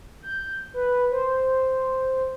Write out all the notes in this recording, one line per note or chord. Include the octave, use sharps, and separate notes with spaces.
G6
B4
C5